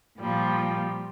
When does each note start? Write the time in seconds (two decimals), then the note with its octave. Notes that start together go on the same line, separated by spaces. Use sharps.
0.19 A#2 F3 G3